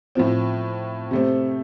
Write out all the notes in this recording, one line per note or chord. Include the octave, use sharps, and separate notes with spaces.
A2 F3 C4
C3 A3 C4